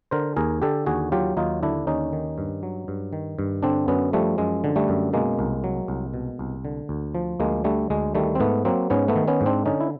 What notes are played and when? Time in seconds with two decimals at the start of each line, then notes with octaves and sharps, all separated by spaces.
0.11 D3 A#4 C5
0.36 D#2 G#4 A#4
0.62 D3 G4 A4
0.86 D#2 F#4 G#4
1.12 F#3 F4 G4
1.37 D#2 D#4 F4
1.63 D3 D4 E4
1.87 D#2 C#4 D#4
2.13 D#3
2.38 G2
2.63 F#3
2.88 G2
3.13 D#3
3.39 G2
3.63 D3 C4 D4
3.88 F#2 B3 C#4
4.13 F3 G3 A3
4.38 F#2 G#3
4.64 D3
4.76 G3 A3
4.89 F#2
5.13 B2 G#3 A#3
5.39 C2
5.64 F#3
5.88 C2
6.14 B2
6.39 C2
6.65 D3
6.89 D2
7.15 F3
7.40 D2 G#3 A#3
7.64 D3 G3 A3
7.90 D2 G#3
8.15 D#3 G3 A3
8.35 C4
8.40 G#2 A3 B3
8.65 F#3 A#3 C4
8.90 G#2 B3 C#4
9.08 A3 B3
9.16 D#3
9.28 B3 C#4
9.41 G#2
9.46 C4 D4
9.66 D3 C#4 D#4
9.81 E4